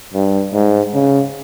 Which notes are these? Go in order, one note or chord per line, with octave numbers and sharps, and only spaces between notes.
G2
G#2
C#3